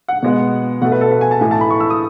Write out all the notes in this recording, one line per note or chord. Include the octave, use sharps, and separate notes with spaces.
F#5
B2 G#3 B3
B2 A3 F#5
B4
A4
B4
G#5
A5
A2 E3 A3 G#5
A5
B5
C#6
E6
D#6